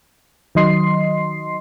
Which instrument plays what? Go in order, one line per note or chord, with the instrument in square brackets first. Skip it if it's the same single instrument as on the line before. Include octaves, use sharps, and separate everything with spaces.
[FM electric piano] D#3 F#3 D#5 C6 C7